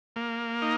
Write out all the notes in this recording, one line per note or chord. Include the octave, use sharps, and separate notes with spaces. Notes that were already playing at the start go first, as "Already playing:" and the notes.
A#3
D#4